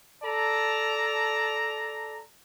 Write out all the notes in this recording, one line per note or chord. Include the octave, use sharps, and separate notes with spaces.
A4 D5 A5 A#5